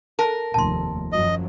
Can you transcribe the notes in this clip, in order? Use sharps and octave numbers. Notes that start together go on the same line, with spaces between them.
A#4 A5
F1 D#2 A5 C6
F#2 F3 F#3 D#5